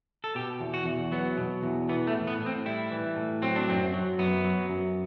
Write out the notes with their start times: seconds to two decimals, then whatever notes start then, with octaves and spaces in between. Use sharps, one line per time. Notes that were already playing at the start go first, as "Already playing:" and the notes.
0.24 A4
0.35 B2 G4
0.60 E2
0.74 F#4
0.86 E2
1.12 F#3 B3
1.37 B2
1.63 E2
1.89 E3 B3
2.07 A3
2.14 A2
2.27 B3
2.40 A2
2.46 C4
2.66 G3 E4
2.91 E3
3.16 A2
3.42 F#3 C4
3.56 D4
3.68 F#2 C4
3.94 F#3
4.19 F#2 B3
4.45 F#3
4.70 F#2